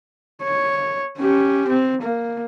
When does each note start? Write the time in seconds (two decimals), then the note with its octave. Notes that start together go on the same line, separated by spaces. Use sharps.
0.43 C#5
1.18 C#4 G4
1.68 C4
2.02 A#3